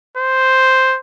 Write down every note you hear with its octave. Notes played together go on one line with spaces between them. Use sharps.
C5